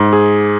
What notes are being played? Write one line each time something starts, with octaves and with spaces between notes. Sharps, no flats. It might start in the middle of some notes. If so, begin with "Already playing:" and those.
Already playing: G#2
G#4